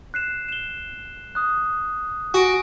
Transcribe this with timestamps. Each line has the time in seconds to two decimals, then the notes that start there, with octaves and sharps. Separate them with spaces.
0.14 F#6 C7 E7
0.49 E7 G7
1.35 D#6 F#6
2.34 F#4 G#5 A#6 D7